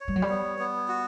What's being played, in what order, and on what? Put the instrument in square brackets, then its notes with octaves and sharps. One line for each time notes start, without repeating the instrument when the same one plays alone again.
[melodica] C#5
[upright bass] G3
F#3
G3
[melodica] B3
B3
F#4